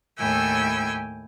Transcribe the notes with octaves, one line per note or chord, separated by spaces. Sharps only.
D#2 A2 E4 G5 G#5 E6